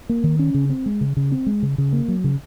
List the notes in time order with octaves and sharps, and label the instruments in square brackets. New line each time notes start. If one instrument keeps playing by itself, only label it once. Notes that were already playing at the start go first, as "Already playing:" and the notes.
[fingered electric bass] A#3
D#3
C#4
C#3
C4
G#3
C#3
C#3
C4
G#3
C#3
C#3
A#3
F#3
C#3